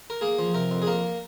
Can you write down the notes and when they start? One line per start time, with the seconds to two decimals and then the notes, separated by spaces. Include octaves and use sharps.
0.10 A#4
0.21 A#3 G#4
0.39 F3
0.54 C3 A#4
0.71 F2
0.82 G#4
0.87 A#3 A#4